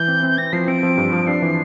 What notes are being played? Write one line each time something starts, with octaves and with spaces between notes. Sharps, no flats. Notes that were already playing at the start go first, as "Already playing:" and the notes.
Already playing: E3 G6
C4
C4
C4 A#6
F3 C7
C4 D7
F3
G2
F3
D4 C7
E3